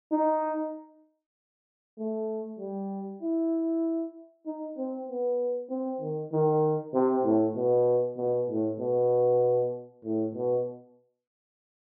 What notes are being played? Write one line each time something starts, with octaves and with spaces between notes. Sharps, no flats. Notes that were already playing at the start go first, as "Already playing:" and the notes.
D#4
A3
G3
E4
D#4
C4
B3
C4
D#3
D#3
C3
A2
B2
B2
A2
B2
A2
B2